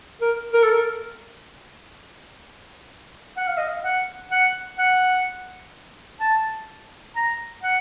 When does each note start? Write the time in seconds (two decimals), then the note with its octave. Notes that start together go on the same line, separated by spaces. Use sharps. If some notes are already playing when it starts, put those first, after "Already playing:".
0.22 A#4
0.53 A#4
0.63 A4
0.72 A#4
3.37 F#5
3.48 F5
3.57 D#5
3.68 F5
3.84 F#5
4.31 F#5
4.78 F#5
6.20 A5
7.16 A#5
7.63 F#5